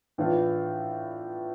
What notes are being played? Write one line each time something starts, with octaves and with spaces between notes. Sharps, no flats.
A2 E3 B3 D4 F4